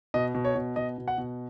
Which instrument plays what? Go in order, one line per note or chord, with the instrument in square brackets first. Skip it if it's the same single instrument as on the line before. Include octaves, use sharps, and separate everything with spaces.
[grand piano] B2 D#5
B2
C#5
B2
B2 D#5
B2
F#5
B2